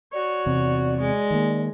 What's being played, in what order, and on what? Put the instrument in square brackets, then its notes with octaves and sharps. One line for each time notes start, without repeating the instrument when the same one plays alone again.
[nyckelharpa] F#4 C#5 [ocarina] D5
[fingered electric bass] E2 C3
[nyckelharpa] G#3
[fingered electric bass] D#3 A#3